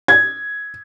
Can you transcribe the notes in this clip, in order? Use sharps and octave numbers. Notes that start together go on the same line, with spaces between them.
G#6